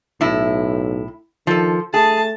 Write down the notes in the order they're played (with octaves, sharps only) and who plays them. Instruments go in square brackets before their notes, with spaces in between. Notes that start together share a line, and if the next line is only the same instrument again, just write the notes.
[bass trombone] B1 [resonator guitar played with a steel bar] A2 E4
[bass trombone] D#3 [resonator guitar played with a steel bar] F3 A4
[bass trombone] A3 [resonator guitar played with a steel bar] G#4 [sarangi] A5